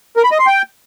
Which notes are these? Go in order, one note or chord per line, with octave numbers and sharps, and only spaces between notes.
A#4
B5
D#5
C6
G5